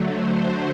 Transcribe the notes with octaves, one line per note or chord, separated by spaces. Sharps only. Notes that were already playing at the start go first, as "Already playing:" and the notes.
Already playing: D3 F#3 A3
C5